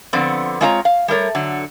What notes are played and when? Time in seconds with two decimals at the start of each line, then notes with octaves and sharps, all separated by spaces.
0.13 D3 F3 B3 C4 D5
0.61 G#3 C4 F4 C#5 G5 A#5
0.85 F5
1.08 G3 A3 A#4 C#5
1.35 D3 F#3